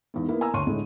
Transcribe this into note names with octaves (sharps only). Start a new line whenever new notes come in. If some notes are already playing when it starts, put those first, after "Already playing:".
E2 G#2
A#3 B3 E4
G#5 A#5 E6
D2 C#5 C6 C#6 D#7
A2 D3 G#3